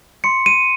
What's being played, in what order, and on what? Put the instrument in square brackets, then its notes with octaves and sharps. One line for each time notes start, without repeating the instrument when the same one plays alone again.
[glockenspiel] C6 C#7
D#7